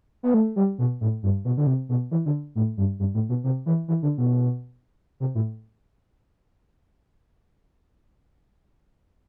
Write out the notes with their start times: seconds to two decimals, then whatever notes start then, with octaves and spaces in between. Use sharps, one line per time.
0.23 B3
0.34 A3
0.56 G3
0.79 B2
1.01 A2
1.23 G2
1.45 B2
1.57 D3
1.67 C3
1.89 B2
2.11 E3
2.26 D3
2.55 A2
2.77 G2
2.99 G2
3.14 A2
3.29 B2
3.44 C3
3.66 E3
3.88 E3
4.03 D3
4.18 B2
5.20 C3
5.35 A2